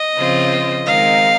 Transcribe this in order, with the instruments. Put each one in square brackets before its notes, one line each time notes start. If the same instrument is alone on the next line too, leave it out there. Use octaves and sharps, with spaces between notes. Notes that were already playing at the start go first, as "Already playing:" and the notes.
Already playing: [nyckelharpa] D#5
[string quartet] C#3 F3 C4 F4 C5
[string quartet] D#3 G#3 C4 D#4 A#4 [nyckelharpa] F5